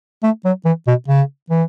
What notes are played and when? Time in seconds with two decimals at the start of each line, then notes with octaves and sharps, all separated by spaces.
0.23 A3
0.45 F#3
0.65 E3
0.87 B2
1.08 C#3
1.50 E3